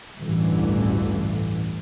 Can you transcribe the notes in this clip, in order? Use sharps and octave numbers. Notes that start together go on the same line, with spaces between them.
A1 D2 G2 D3 E3